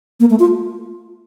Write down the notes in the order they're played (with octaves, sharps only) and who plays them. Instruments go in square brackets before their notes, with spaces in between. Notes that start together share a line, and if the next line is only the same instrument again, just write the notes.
[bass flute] A#3
A3
F4